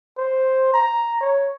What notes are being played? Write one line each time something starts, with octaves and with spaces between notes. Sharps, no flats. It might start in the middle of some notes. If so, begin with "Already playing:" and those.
C5
A#5
C#5